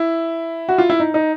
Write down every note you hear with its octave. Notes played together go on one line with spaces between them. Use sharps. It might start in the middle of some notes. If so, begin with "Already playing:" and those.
Already playing: E4
F#4
F4
E4
D#4
D#4